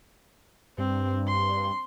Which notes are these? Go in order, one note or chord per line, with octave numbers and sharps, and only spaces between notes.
G2 C4
C6